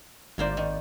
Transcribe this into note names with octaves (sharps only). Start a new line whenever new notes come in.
G#1 A2 A#3 C5 D5
D#3